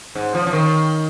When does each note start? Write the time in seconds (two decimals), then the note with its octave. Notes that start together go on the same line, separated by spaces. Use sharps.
0.15 G#2
0.35 F3
0.47 F3
0.53 D#3